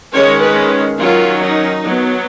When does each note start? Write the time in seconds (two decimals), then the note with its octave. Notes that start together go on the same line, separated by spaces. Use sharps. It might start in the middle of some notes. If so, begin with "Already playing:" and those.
0.13 D#3 G#3 C#4 C#5
0.42 B4
0.98 D#3 F#3 C#4 F4
1.42 D#4
1.84 F#3 B3